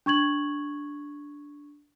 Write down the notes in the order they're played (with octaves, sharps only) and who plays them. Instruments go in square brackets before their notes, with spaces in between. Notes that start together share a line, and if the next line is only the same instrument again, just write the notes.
[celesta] D4 C#6 G#6 F#7